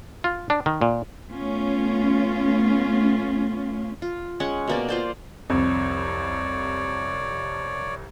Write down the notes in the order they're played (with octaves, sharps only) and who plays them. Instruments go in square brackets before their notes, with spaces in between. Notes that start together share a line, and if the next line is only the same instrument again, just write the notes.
[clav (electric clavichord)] F4
D4
D#3
A#2
[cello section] A3 B3 C#4 F4
[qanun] F4
G#3 C#4 F#5
B2 A#3 D5
F4 C5 D5
[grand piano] C2 F2 [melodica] C#5 D5